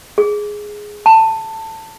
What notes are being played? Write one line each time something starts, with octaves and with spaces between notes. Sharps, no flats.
G#4
A5